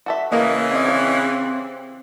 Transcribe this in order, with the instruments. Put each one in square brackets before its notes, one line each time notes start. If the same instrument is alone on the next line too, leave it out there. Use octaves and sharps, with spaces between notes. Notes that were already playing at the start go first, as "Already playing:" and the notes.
[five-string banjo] F#4 A4 E5
[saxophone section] C#3 E3 [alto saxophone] A#3 [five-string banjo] D#5
[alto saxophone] C4 [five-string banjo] G4 D#5
[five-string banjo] G4 F5